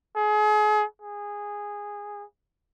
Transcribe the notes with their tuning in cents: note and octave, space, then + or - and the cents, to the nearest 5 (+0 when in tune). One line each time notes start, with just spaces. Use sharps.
G#4 +35
G#4 -15